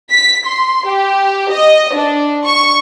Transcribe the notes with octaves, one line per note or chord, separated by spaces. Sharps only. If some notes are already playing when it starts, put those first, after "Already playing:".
B6
C6
G4
D#5
D4
C#6